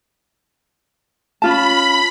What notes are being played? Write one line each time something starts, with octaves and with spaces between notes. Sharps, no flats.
C#4 F4 A5 B5